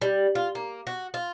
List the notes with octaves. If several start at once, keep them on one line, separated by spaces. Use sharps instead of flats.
G3
F4
A#3
F#4
F4